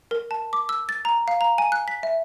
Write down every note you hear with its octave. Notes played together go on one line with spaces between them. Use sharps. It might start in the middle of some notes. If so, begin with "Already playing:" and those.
A#4
A5
D6
E6
A6
A#5
F5
A#5
G#5
F#6
B6
E5